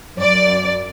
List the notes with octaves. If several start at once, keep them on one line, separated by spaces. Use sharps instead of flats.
F#2 D5